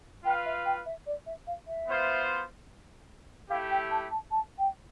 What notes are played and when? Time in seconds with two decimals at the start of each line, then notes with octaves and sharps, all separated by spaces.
0.24 F4 B4 F5 G5
0.45 E5
0.65 G5
0.85 E5
1.06 D5
1.26 E5
1.47 F5
1.67 E5
1.87 B3 F4 C5 F5
3.49 A3 E4 G4 F5
3.70 G5
3.90 A5
4.10 A5
4.31 A5
4.58 G5